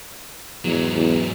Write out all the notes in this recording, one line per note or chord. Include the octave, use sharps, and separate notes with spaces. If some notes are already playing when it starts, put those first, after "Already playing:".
E2 G#2 F#3
E2